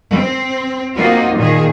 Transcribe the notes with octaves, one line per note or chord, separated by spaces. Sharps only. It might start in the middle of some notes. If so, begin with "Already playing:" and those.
C4
A#3 C4 D#4 F4 F#4
A#2 D#3 G#4